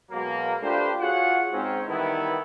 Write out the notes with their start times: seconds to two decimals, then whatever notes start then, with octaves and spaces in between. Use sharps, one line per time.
0.11 B2 F#3 G#3 A#3
0.62 A3 D4 F4 G4 B4 C5
1.00 F4 F#4 G#4 C#5 F#5
1.51 G#2 C4 C#4
1.86 D#3 E3 G3 A3 B3 E4